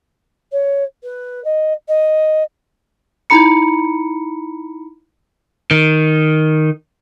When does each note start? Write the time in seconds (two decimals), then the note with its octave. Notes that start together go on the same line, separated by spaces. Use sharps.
0.52 C#5
1.03 B4
1.44 D#5
1.88 D#5
3.30 D#4 E4 A#5 B5 C#7
5.71 D#3